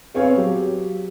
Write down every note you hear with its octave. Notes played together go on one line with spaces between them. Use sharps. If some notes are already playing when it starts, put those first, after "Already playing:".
B3 C4 G#4 C#5 F5
F#3 G4